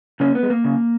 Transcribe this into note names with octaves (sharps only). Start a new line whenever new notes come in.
C#3 A#3 C#4
B3
G#3
A#3
C#3